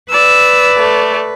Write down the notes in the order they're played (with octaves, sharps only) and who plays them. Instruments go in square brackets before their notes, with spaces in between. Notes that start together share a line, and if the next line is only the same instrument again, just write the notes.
[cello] B4 [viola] D5 [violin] E6
[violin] A3